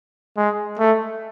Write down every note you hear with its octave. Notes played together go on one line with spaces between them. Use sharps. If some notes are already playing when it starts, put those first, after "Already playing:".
G#3
A3